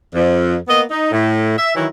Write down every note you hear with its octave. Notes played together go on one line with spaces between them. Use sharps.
F2
A#3 B3 D#5
D#4
A2
E5
D#3 E3 F#3 E4